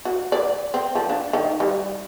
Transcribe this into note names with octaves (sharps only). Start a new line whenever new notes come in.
F#4
D5
C4
F3
D4
D#3
G3